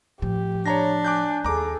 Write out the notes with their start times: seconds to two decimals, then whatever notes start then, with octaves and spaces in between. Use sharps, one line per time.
0.22 A2 F3 G4
0.66 D4 C#5 A#5 A#6
1.05 G#5 D6 F#6 G6
1.44 D#2 G#4 A4 A#5 D6